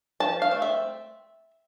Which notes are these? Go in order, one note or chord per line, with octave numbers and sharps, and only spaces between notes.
F3 A5
F5
A3 C4
E5